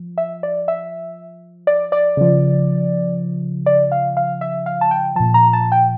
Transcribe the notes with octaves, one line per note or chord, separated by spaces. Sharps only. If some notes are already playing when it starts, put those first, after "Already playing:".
Already playing: F3
E5
D5
E5
D5
D5
C#3 F3
D5
F5
F5
E5
F5
A5
G5
A#2 F3 A5
A#5
A5
G5